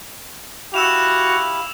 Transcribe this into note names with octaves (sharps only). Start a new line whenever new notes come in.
E4 F#4 G4 F5 E6 E7 F7